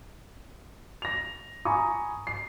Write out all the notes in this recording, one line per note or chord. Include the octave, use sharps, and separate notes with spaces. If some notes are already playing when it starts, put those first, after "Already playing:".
A#6 F7
G#5 A#5 B5 C#6 D#6
C7